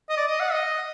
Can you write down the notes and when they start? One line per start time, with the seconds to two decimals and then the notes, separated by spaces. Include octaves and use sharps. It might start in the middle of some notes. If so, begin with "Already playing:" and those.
0.10 D#5
0.17 D5
0.28 D#5
0.40 F#5
0.52 D#5